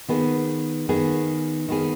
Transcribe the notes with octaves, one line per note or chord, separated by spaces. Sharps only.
D#3 B3 G#4
D#3 B3 G#4
D#3 B3 G#4